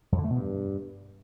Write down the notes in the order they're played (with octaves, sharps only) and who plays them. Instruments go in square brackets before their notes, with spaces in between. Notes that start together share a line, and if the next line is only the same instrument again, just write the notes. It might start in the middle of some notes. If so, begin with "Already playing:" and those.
[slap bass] F2
D3
A3
B2
G2